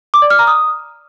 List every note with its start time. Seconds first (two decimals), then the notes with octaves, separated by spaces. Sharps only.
0.14 D6
0.22 D5
0.30 F6
0.39 A#5
0.47 D#6